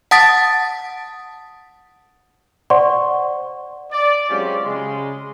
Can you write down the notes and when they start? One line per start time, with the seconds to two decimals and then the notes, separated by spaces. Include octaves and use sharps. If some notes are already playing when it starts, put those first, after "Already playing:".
0.11 F#5 A5 D#6 A6 B6
2.70 C5 D5 F#5 C6 C#6
3.91 D5
4.29 F#3 G#3 C4 C#4 F4 G4
4.64 C#3 G#3 C6